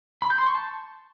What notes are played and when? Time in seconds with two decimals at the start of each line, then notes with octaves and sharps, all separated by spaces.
0.22 B5
0.30 G6
0.38 C6
0.47 C#6
0.55 A5